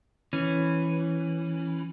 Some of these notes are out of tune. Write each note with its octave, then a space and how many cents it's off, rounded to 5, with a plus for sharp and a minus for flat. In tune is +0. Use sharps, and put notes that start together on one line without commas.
E3 +0 C#4 -15